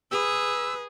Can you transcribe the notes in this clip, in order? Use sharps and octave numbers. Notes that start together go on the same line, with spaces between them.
G#4 B4 E6